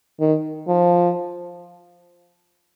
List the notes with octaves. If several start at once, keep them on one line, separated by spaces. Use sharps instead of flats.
D#3
F3